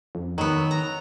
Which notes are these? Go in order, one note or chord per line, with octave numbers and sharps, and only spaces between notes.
F2
D#3 F#3 B3
A#5